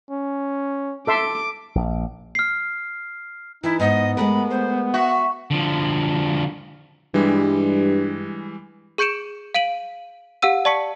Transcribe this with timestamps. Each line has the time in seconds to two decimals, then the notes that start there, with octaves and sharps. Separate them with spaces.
0.10 C#4
1.07 A4 E5 C6 D6
1.75 A#1
2.35 F6 C7
3.64 E3 D#4 E4
3.80 G#2 B3 D#5
4.17 G#3 A3 A#4 B5
4.50 C5
4.94 F#4 E5
5.51 D3 F3
7.14 G2 E3 G3 G#3
8.98 G#4 C#6 G6 C#7 D7 E7
9.54 F5 D7 D#7 F#7
10.42 G4 F5 F#5 E6 D#7
10.65 D5 A5 C#6 B6 C#7